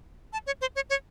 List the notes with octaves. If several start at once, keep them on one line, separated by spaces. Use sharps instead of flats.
A5
C#5
C5
C#5
C#5